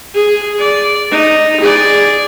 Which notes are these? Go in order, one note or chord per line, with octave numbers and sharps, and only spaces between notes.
G#4
D5
D#4
G#4 D5